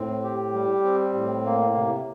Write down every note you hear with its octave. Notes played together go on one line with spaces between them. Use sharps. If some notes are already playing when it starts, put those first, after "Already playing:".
Already playing: A2 C4
G4
G3
C4
A2
A#3
C3